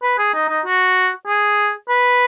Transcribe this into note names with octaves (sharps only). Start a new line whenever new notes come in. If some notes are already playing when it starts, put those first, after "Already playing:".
B4
G#4
D#4
D#4
F#4
G#4
B4